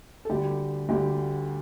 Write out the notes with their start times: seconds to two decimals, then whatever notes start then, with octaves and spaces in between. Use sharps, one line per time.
0.25 A4
0.30 D2 D3 G3 G4
0.89 D2 D3 G3 G4